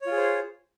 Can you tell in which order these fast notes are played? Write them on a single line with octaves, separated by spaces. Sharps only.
C#5 F4 G#4 C5